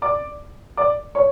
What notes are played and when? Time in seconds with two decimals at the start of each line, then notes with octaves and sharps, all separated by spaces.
0.02 D5 D6
0.77 D5 D6
1.15 C#5 C#6